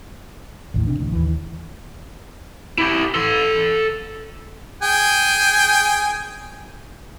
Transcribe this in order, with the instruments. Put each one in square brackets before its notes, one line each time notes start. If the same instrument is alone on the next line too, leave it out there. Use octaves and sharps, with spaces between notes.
[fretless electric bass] A1 D#2 A2
C3 D4
A1 D2
D#2 E3
[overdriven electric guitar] E4 G4
A4 C6
[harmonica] G#4 G5 G#5